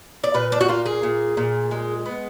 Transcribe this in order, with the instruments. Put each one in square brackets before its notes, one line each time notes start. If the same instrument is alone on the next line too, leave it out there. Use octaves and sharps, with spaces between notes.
[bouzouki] D5
A#2 B4
D4
F#4
A#3 F4
G#4
A#2
A#2
G#3
B3